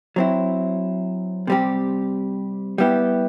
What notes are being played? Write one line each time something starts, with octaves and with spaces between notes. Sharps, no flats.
F#3 C4 E4
C3 G3 C4 G4
G3 B3 E4 G4